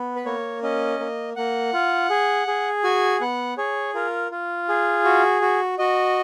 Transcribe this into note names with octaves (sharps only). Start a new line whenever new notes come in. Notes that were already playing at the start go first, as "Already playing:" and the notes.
Already playing: B3
B4
A#3 C#5
C#4 D#5
A#3
A#3 F#5
F4
G#4
G#4
F#4 G#5
B3 F#5
G#4 C#5
F4 A#4
F4
G#4
F#4
F#4
F#4 D#5